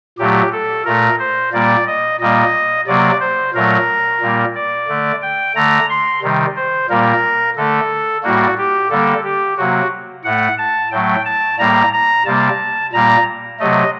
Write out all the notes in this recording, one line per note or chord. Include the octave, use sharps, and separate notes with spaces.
A#2 F#3 A3 G4
A4
A#2 A3 A#4
C5
A#2 G3 A#3 D5
D#5
A#2 G3 A#3 D#5
C3 F#3 A#3 D5
C5
A#2 F#3 A3 A#4
A#2 G3 A#3
D5
D3 A3
G5
D3 A3 A#5
C6
C3 D#3 G3
C5
A#2 G3 A#3 A#4
D3 A3 A4
A2 G3 A#3 F#4
G4
D3 G3 A#3 A4
G4
C3 F#3 A#3 F#4
A2 A3 F#5
A5
A2 F#3 A3 G5
A5
A2 G3 A#3 A#5
A#5
C3 G3 A#3 A5
A#2 G3 A#3 A#5
C3 F#3 A3 D#5